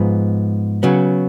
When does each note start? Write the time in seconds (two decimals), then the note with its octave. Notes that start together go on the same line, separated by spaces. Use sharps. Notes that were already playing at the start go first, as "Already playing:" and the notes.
Already playing: G#2 F3 B3
0.83 C#3 F#3 B3